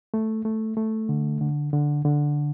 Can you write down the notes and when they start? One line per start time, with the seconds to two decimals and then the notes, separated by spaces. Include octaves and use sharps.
0.14 A3
0.45 A3
0.77 A3
1.09 D3
1.41 D3
1.73 D3
2.05 D3